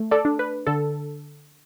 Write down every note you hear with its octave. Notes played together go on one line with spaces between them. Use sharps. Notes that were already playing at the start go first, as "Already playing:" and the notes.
Already playing: A3
A4 D5
D4
B4
D3 A4